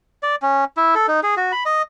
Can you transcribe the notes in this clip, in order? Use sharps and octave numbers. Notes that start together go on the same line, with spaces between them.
D5
C#4
E4
A4
D#4
G#4
F#4
B5
D#5